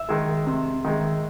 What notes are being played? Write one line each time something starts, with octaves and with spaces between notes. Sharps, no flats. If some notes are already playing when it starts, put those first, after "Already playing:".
Already playing: E5
D#3 G#3
C3
D#3 G#3